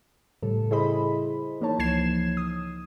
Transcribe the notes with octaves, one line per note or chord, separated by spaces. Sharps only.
A2 C#3 G3 A4
E4 G#4 C5 D#5 B5
E3 A#3 D#4 C#5 A5
C#2 E3 F3 G#6 C7 E7
D#6